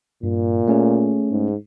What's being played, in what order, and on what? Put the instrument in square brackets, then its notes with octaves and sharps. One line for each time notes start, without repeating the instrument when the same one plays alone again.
[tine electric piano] G2 [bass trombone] A#2
[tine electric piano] A3 C#4 G#4
[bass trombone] G#2